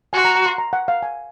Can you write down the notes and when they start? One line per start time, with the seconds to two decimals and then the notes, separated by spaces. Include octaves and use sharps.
0.13 F#4 G#5
0.19 C6
0.25 A#5
0.35 A#5
0.46 C6
0.58 A#5
0.73 F#5
0.88 F5
1.03 G#5